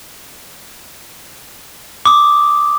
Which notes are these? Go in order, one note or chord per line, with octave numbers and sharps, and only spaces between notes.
D6 D#6